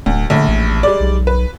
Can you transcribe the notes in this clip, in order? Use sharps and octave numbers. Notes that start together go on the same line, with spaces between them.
D1 D2
A#1 A2 D3
A1
G3 G#3 D5
B1
B4